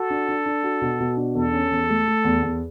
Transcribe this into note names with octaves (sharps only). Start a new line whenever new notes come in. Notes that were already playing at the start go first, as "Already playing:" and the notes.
Already playing: F#4 A4
D4
D4
D4
F#4
B2
B2
D4
E2 A4
C#4
E2
A3
A3
E2
E2